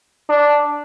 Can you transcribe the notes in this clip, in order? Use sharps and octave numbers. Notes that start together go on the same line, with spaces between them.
D4